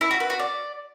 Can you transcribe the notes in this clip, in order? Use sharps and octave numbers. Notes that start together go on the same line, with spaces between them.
E4
F#4
B4
F#4
D5